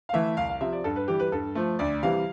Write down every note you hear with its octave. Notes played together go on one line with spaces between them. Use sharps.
F5
E3 A3 E5
C2 F5
F5
C3 F3 E5
D5
G2 A4
B4
E3 G3 G4
B4
G2 A4
F3 A3
D2 D5
C3 E3 G3 F5